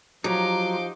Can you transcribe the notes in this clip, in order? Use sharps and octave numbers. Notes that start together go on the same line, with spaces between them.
F3 F#3 D#4 G4 A#5 C6 D6